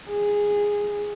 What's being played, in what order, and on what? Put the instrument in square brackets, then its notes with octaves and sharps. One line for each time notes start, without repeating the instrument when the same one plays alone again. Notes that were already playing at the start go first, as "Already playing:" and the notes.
[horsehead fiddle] G#4